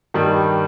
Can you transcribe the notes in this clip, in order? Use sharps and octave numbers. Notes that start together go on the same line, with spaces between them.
G2 D#3 G3